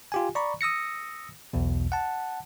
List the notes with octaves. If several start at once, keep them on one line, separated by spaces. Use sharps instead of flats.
F4 G4 G#5
D5 A#5 B5 C#6
D#6 E6 A#6 C#7
B1 E2 B2
F#5 A5